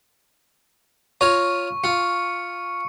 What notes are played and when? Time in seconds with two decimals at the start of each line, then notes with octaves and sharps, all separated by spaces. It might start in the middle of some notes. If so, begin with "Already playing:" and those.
1.21 F4 C#5 A#5 C#6
1.84 F4 C#7